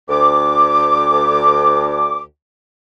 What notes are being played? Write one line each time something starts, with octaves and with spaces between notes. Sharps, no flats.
D2 D6